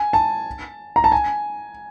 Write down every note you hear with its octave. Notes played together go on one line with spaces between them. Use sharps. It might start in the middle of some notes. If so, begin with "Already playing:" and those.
Already playing: G#5
A5
A#5
A5
G#5